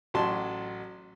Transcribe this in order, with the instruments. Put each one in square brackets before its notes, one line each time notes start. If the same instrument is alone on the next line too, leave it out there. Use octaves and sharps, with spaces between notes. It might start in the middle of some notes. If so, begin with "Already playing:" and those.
[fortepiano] A1 F#3 A5 C6